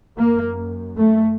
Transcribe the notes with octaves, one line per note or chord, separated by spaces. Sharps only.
F#2 A#3
A3